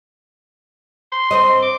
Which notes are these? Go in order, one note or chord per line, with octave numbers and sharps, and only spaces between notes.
C6
C4 C5 D#5
D6